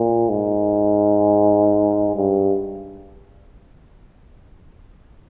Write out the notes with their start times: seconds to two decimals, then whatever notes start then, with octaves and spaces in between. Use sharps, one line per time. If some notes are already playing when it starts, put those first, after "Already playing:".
Already playing: A#2
0.29 G#2
2.16 G2